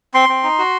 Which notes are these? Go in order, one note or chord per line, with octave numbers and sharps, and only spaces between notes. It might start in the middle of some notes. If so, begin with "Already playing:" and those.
C4 C6
C4
D#4
F#4